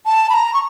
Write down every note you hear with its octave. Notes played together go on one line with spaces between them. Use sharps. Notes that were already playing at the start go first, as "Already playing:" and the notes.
A5
B5
A#5
C#6